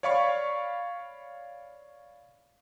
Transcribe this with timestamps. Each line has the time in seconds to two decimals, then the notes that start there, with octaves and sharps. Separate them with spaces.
0.03 C#5 D5 F5 B5 C#6